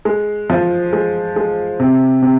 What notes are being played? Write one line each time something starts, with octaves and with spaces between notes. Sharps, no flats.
G#3
F3
G#3
G#3
C3
C3